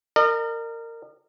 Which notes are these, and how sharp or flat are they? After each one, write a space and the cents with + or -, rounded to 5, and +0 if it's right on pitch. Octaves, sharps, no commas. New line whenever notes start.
A#4 -20 D#5 -45